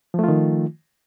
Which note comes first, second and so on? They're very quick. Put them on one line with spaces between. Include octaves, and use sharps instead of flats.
F3 A3 F4 D#3